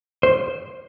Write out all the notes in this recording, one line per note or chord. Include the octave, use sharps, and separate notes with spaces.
C5